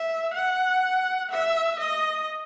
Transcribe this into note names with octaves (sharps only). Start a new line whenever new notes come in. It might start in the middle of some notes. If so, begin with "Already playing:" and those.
Already playing: E5
F#5
E5
D#5